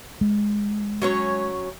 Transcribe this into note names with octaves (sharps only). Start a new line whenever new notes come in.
G#3
F#3 C#4 C#5